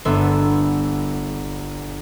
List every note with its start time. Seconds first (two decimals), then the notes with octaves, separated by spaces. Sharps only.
0.05 G1 B3 A4 E5 C6